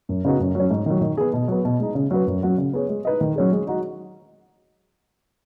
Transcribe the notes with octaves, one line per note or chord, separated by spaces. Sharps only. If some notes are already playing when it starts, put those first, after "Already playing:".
F#2
C#3 B3 D#4 F#4
F#2
F#3 C#4
G#2
D#3 F#3
D#3
B3 G#4
B2
F#3 B3
B2
G#3 D#4
C#3
F#3 C#4 F#4 B4
F#2
F#3 C#4 F#4 C#5
C#3
B3 G#4 C#5
G#3
D#4 B4 D#5
D#3
F#3 C#4 G#4
G#3
D#4 F#4